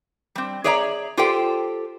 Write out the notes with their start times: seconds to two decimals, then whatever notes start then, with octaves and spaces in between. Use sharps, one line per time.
0.35 G3 C4
0.64 G#4 C#5 D5 E5 F#5 A#5
1.17 F4 G4 A4 C5 D5 G5